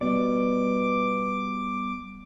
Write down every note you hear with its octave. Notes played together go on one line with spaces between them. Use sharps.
B2 G3 B3 D5 D6